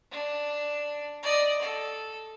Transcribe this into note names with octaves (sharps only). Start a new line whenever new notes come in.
D4
D5 D#5
A4